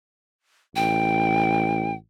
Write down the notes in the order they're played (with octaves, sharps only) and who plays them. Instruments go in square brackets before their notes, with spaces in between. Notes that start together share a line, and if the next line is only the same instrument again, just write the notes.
[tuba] A1 [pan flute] G5